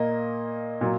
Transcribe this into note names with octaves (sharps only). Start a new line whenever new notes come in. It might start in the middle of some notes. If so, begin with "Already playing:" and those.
Already playing: A#2 A#3 D#5
A#2 F#3